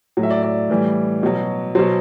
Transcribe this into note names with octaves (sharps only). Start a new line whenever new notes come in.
A2 F#3
E5
D5
D5
A2 E3 G3
B2 F#3
B2 F#3 C5